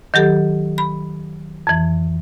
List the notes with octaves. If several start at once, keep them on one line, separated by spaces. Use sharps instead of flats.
D#3 F#3 G4 A4
B5
F2 E3